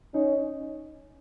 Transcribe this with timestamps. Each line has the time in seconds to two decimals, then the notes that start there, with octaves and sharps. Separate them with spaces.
0.14 C#4 D#4